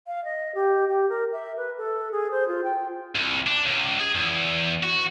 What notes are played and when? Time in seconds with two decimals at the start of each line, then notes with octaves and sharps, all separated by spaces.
0.07 F5
0.25 D#5
0.55 G4
0.88 G4
1.09 A#4
1.32 E5
1.57 B4
1.78 A4
2.12 G#4
2.31 C5
2.48 F4
2.64 G5
3.15 C2
3.47 D4
3.66 C#2
4.00 G#4
4.15 E2
4.83 F#4